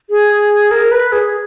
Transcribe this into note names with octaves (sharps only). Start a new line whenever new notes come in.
G#4
A#4
B4
G#4